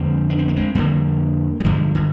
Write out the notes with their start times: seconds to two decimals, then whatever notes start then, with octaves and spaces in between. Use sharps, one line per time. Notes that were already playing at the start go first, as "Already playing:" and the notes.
Already playing: F2 D3 G#3 C4
0.30 D4
0.38 C4
0.48 A#3
0.56 G#3 C4
0.75 F2 D3 G3 A#3
1.60 G3
1.64 G2 D3 F3 G#3
1.95 D3